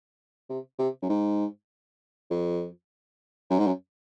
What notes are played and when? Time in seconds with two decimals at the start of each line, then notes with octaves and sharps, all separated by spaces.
0.50 C3
0.79 C3
1.02 F#2
1.09 G#2
2.31 F2
3.50 F#2
3.59 G#2
3.67 F#2